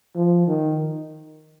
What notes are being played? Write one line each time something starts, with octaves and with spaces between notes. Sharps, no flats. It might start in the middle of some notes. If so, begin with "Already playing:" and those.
F3
D#3